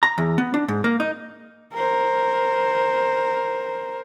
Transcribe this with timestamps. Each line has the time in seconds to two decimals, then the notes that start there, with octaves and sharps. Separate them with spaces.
0.03 A#5
0.18 E2
0.38 B3
0.54 D4
0.68 G#2
0.84 A#3
1.00 D#4
1.74 A#4 C5